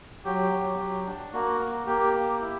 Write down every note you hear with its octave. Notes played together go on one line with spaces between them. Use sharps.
F#3 G4
F#3
F#3
D4
A#3 F#4
A#3
A#3 G4
A#3
E4